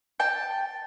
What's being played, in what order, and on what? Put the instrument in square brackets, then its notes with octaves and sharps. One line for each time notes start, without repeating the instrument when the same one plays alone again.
[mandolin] G5 A5